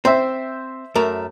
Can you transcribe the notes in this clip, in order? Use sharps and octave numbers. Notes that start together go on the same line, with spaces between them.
C4 C5 E5
F#2 A3 A#4